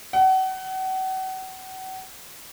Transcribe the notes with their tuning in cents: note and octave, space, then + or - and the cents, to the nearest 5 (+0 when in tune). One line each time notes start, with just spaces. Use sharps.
F#5 +35